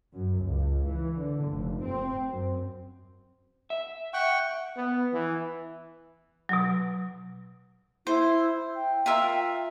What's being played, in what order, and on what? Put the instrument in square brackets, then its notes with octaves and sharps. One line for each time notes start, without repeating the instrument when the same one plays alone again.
[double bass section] F#2
C#2
E3
D3
F1
C4
F#2
[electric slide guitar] E5
[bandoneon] F#5 G5 C#6
[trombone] B3
E3
[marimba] B2 F#3
[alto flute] E4 [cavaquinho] C5
[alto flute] G5
[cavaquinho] F4 A#4 E5